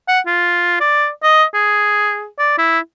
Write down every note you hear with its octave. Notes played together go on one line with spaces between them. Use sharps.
F#5
F4
D5
D#5
G#4
D5
E4